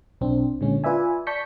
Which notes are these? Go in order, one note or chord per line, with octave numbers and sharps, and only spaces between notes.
B1 C4 D4
A#2 D3 G#3 C#4
F4 B4 D5 E5 G#5
D5 A5 C#6 G6 B6 C#7